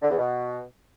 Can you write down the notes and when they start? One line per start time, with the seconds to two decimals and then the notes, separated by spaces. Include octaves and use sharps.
0.02 D3
0.10 E2
0.18 B2